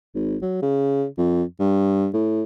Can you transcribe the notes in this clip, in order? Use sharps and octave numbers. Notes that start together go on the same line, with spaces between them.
G#1
F#3
C#3
F2
G2
A2